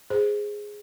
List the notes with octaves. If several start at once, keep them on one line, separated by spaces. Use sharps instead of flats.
G#4 C5